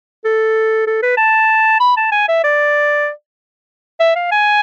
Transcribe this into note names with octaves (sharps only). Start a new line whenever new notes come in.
A4
A4
B4
A5
B5
A5
G#5
E5
D5
E5
F5
G#5